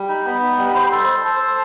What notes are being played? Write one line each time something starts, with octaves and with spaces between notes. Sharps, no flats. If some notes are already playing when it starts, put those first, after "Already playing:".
Already playing: G3
D#4 B5
B3 B5
D#4
G3
C5
A4
C5
A4 A5
C5